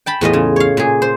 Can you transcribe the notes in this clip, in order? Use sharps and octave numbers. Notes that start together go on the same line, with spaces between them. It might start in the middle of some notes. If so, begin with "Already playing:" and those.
G5 A5 B5
E2 A2 F4 D#5
C#3
C#5 F5
A#2 G#4
C5